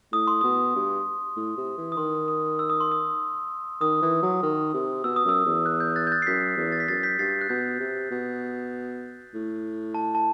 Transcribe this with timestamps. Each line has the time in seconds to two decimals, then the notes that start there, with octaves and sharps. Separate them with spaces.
0.13 A2 D#6
0.27 C6
0.41 B2 D#6
0.75 G2
1.36 A2
1.57 C3
1.78 E3
1.92 D#6
1.97 D#3 C6
2.28 D#6
2.59 E6
2.70 D#6
2.80 C6
2.92 D#6
3.81 D#3 D#6
4.02 E3
4.22 F#3
4.42 D#3
4.74 C3
5.04 B2 E6
5.16 D#6
5.25 F#2 E6
5.45 E2
5.66 F#6
5.80 G6
5.96 F#6 A6
6.07 G6
6.12 F#6 A6
6.22 C7
6.27 F#2 G6 B6
6.57 E2
6.72 A6
6.80 B6
6.88 F#2 A6 C7
7.03 G6 B6
7.19 G2 A6 C7
7.41 F#6
7.49 B2 G6
7.80 C3
8.11 B2
9.34 A2
9.94 A5
10.15 A5